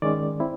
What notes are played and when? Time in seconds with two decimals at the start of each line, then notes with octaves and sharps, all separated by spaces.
0.02 D#3 G#3 C#4 D5
0.40 C4 E4